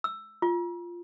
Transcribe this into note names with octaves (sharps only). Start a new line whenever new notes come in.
E6
F4